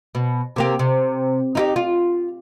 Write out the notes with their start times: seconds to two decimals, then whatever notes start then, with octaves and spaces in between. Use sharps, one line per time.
0.15 B2
0.56 C3 A#3 G4
0.79 C3
1.55 D#4 E4 G4
1.76 F4